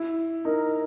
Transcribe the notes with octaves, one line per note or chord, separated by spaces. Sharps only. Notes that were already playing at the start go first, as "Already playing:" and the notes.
Already playing: E4
D#4 A#4